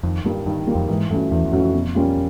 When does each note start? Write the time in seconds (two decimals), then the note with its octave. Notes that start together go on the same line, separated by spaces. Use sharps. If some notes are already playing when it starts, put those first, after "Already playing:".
0.03 F2 D#3
0.25 G2 G3 A#3
0.46 G2 D#3
0.67 G3 A#3
0.75 F2
0.89 G#2 E3
1.10 G2 A3 C#4 F#4
1.31 E2 E3
1.45 E2
1.52 F#2 A3 C#4 F#4
1.59 F2
1.73 B2
1.95 G3 A#3 C#4 F4